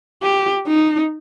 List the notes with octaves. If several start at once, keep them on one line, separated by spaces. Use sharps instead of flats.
G4
D#4